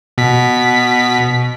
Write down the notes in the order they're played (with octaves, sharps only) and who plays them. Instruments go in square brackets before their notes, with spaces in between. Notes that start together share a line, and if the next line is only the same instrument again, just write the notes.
[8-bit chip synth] B2 B6